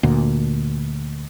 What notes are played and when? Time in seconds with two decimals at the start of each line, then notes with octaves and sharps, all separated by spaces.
0.03 D2 A#2